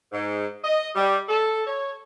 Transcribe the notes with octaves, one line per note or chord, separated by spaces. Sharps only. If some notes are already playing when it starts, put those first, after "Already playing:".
G#2
D#5
G3
A4
C#5